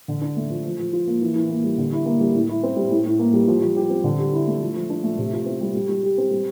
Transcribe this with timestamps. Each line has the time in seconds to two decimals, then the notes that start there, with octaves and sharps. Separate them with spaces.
0.08 D3
0.21 D4
0.37 A3
0.50 F3
0.65 F3
0.79 F3
0.93 F4
1.07 A#3
1.21 E3
1.36 E3
1.49 A#3
1.64 G3
1.78 D3
1.93 E4
2.06 A#3
2.21 G3
2.34 A2
2.49 E4
2.63 C4
2.76 G3
2.91 A2
3.05 A2
3.19 A#3
3.34 G3
3.48 F3
3.62 F3
3.77 G4
3.90 C4
4.04 D3
4.19 G4
4.33 E4
4.47 A3
4.61 F3
4.76 F3
4.90 D4
5.04 A3
5.18 C3
5.33 F4
5.46 C4
5.60 G3
5.74 G3
5.89 G3
6.03 G4
6.18 C4
6.31 G3